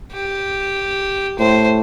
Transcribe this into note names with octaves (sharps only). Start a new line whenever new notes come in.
G4
A2 C5